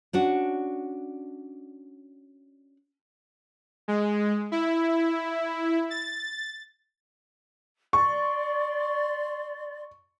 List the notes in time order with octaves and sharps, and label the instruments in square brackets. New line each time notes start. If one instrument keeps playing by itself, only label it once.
[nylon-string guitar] C#4 D4 F#4
[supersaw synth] G#3
E4
A6
[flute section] D5 C6 [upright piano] C#6